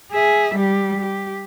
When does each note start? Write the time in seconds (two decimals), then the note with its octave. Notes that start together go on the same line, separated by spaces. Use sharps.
0.11 G#4 E5
0.55 G3 G4
1.01 G4